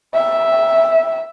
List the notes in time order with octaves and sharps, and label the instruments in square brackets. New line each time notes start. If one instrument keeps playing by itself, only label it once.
[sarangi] E5